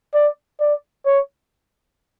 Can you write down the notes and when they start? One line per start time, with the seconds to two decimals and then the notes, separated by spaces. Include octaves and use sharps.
0.14 D5
0.60 D5
1.06 C#5